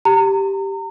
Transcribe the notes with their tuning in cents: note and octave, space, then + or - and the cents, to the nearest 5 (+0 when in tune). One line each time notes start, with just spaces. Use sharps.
G4 -5 A#5 -30